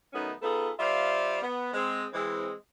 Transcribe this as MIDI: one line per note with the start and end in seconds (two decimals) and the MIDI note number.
0.13 0.31 51
0.13 0.31 54
0.13 0.31 57
0.13 0.31 59
0.13 0.31 61
0.13 0.31 63
0.42 0.70 59
0.42 0.70 63
0.42 0.70 65
0.42 0.70 68
0.42 0.70 69
0.80 1.39 55
0.80 1.39 65
0.80 1.39 72
0.80 1.39 74
0.80 1.39 76
0.80 1.39 77
1.42 1.70 59
1.73 2.05 56
1.73 2.05 60
2.13 2.51 52
2.13 2.51 56
2.13 2.51 60